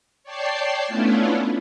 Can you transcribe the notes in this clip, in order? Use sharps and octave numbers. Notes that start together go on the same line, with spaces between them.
C#5 D5 G5 A5 C7
A3 B3 C#4 D4 E4 F4